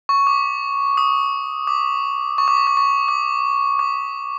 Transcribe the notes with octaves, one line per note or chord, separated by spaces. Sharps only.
C#6
D6
D#6
D6
C#6
D6
C#6
D6
C#6
D6
D6